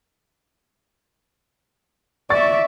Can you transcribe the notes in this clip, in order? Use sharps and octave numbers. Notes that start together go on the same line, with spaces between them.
D5 E5 C#6 A6